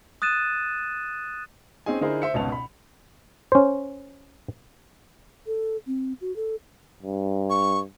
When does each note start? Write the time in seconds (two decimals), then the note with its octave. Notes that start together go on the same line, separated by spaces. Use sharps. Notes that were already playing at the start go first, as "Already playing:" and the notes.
0.22 D#6 F#6 A6 D#7 E7
1.86 C4 C#4 D#4 G#4 G#5
2.01 D3 D#4 E4 G#4 A#4 C5
2.22 C5 E5 C#7
2.34 G#1 C#2 B2 C#4 A5 F7
2.52 B5
3.52 C#4 C5
5.47 A4
5.87 C4
6.21 F#4
6.36 A4
7.02 G2
7.50 C#6